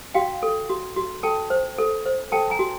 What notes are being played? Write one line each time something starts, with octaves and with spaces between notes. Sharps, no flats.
F#4 F5 G5
A4
F#4
F#4
A4 G5 A5
C5
A4
C5
A4 G5 A5
G#5 A#5
F#4